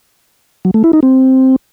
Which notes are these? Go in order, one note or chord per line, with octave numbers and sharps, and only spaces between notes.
F#3
A3
E4
D#4
C4